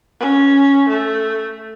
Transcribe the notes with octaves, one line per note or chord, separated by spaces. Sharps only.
C#4
A3